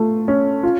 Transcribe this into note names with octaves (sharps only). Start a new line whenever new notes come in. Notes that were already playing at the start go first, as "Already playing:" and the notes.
Already playing: A3 F4
C#4
F4